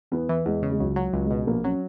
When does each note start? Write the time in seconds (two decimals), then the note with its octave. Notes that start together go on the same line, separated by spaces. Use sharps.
0.12 E2 B3
0.29 E3
0.46 E2 G#3
0.62 C#3
0.72 G#3
0.80 C#2 F#3
0.96 F#3
1.13 C#2
1.25 G#3
1.30 B2
1.47 A#1 A#3
1.64 F#3 C#4